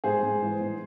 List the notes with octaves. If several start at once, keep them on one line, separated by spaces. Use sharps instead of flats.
G#2 G#4 C5
G#2
E3
G#2